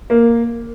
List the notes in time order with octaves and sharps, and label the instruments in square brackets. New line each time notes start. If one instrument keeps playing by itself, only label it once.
[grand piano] A#3